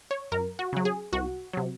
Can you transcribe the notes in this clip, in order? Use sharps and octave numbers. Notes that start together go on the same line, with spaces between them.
C#5
F#2 A#4
F#4
C#3 F#3
G#4
C2 F#4
C3 F#3